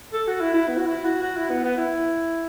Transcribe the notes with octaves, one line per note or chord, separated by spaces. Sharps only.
A4
F#4
E4
E4
B3
F#4
E4
F#4
F#4
E4
B3
B3
E4